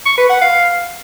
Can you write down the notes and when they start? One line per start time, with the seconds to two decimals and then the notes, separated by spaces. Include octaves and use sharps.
0.06 C#6
0.18 B4
0.29 F#5
0.41 F5